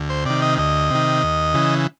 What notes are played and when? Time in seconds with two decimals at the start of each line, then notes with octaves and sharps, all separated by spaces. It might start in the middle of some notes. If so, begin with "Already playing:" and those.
Already playing: D2
0.10 C5
0.26 C3 D#3 D5
0.42 D#5
0.58 D2 D#5
0.90 C3 D#3
1.23 D#2
1.54 C#3 E3